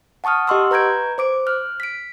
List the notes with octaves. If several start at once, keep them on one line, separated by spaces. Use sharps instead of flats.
F#5 A5 C#6 D#6 F6
G4 D#5 F#5 C6 C#6 E6
B4 A#5 G6 G#6 D7
C5 D6 D7
F6 F#6
B6 D7